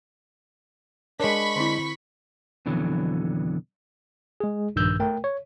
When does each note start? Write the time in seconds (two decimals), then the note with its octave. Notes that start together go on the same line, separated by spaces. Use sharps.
1.20 G#3 D4 A#4 C#5 B5 C#6 B6
1.56 D3 C4 E4
2.66 F2 B2 D3 E3 F#3
4.40 G#3 G#4
4.76 A#1 G2 D#3 E6 G6
5.00 A3 A#4 G5
5.24 C#5